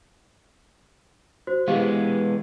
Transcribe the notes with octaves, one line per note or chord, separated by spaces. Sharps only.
F#4 C5
E3 G#3 B3 G4 F5